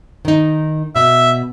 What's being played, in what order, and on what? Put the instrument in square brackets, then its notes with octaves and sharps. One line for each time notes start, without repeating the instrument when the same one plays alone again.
[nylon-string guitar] D#3 D#4
[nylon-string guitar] B2 [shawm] E5